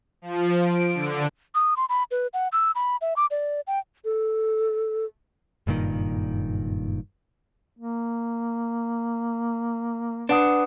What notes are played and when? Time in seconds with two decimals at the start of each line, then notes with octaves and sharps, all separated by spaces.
0.22 F3
0.61 D7
0.95 D3
1.55 D#6
1.77 C6
1.89 B5
2.11 B4
2.34 F#5
2.52 E6
2.75 B5
3.01 E5
3.16 D6
3.31 D5
3.67 G5
4.05 A4
5.67 F#1 G2 A#2 D#3
7.78 A#3
10.29 D4 B4 F#5 D#6